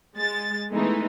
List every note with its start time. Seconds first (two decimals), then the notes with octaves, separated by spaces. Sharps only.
0.16 G#3 A6
0.73 E3 G#3 A3 B3 D#4